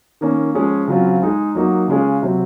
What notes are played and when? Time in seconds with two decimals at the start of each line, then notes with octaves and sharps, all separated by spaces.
0.21 D#3 A#3 C#4
0.55 F3 G#3 C#4 G#4
0.87 C#3 F#3 C4 F4
1.22 G#3 D#4 G#4
1.55 F#3 A#3 D#4 F#4
1.88 C#3 G#3 C#4 F4 G#4
2.22 C3 F#3 C4